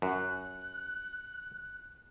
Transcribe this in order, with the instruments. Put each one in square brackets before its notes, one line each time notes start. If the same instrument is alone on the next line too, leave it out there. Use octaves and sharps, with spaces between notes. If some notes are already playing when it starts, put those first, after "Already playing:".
[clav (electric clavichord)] F#2 [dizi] F#6